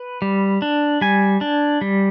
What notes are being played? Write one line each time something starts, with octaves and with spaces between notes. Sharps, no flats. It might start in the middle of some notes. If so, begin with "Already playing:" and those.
Already playing: B4
G3
D4
G3 G#5
D4
G3